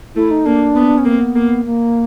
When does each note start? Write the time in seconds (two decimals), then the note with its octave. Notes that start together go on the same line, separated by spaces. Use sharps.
0.16 A3 E4
0.31 D#4
0.46 A#3 D4
0.76 B3
0.98 C#4
1.05 A#3 C4
1.21 B3
1.35 A#3
1.65 A#3